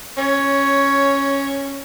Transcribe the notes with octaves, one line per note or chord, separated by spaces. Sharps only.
C#4 C#5